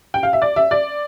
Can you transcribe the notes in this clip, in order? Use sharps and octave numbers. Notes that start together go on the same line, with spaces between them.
G5
F5
E5
D5
E5
D5